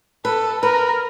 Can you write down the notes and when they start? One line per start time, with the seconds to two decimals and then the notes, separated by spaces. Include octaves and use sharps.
0.25 A4 B4
0.63 A#4 B4